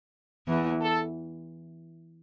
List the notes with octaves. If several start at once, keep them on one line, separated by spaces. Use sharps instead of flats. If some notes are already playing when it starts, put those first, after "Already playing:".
E2 E3
A4